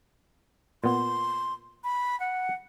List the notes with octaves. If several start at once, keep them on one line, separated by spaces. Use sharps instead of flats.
A#2 B3 C6
B5
F#5